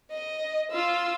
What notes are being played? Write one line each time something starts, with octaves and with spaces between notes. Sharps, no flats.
D#5
F4 E6